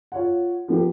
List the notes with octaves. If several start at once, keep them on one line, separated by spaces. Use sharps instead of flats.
F4 C#5 F#5
F3 B3 G4